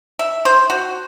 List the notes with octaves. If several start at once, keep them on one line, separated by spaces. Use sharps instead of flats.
E5
C5
F#4